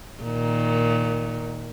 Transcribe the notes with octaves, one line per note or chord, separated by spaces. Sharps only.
A#2 D#3